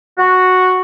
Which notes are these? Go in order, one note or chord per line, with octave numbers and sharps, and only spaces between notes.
F#4